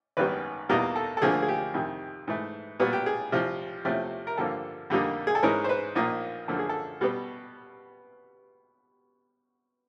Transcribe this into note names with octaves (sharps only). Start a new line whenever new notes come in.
G#1 F#2 D#3 G3 B3 B4
E2 B2 G3 A#3 D#4 A#4
A4
A4
D2 D3 F3 A#3 G#4
G#4
G4
F2 C3 D#3
G#2 E3 A3
A#2 G3 B3 F#4
G4
G#4
C2 C3 F3
E2 C3 F3 A3 C#4
A#4
G2 D3 F3 A#3 A4
F2 D3 G3 A#3 D#4
G#4
A4
G#2 E3 G#3 C#4 A#4
C5
B4
A#1 A#2 F3 A#3 D#4
F#2 D3 F3 A#3 A4
G#4
A4
B2 G3 B3